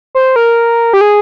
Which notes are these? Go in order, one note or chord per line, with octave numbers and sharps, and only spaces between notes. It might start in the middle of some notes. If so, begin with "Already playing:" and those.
C5
A#4
G4
G#4